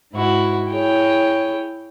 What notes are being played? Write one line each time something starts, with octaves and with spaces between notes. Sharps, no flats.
G#2 E4 F#4
E4 G#4 C#5 G5